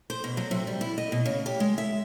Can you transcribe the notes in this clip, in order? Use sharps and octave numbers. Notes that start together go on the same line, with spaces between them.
C5
B2
F#3
C3
G3
E4
D#5
B2
C#3
G4
G#3
E5